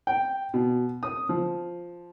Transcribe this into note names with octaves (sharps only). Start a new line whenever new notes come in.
G5
B2
D#6
F3